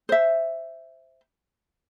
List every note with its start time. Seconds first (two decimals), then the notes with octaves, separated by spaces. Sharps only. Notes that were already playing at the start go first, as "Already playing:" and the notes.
0.09 C5 E5